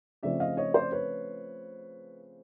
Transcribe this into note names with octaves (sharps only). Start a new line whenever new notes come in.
C#3 F3 A3 C4 D5 E5
D#5 F5
C#5 D#5
C5 D5
B4 C#5